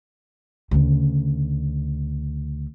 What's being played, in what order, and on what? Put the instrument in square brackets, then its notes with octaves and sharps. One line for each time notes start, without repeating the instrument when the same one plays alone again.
[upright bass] D2 C#3